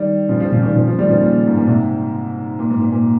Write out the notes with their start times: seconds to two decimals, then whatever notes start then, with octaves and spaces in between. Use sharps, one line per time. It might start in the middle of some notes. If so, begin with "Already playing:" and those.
Already playing: D#3 G3
0.29 C#3 F3
0.40 C#3 F3
0.52 C#3 F3
0.63 D#3 G3
0.75 C#3 F3
0.86 C#3 F3
0.99 D#3 G3
1.09 C#3 F3
1.20 A#2 C#3
1.47 G#2
1.57 A#2
1.67 G#2 C3
2.59 A#2
2.70 G#2
2.81 A#2
2.92 A#2